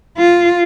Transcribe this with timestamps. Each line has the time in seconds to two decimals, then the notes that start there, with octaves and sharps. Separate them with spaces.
0.18 F4